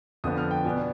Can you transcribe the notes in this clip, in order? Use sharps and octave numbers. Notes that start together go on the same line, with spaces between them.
F2 D3 F3 B3 D#6
F6
G5
B2 B3 D4 G#5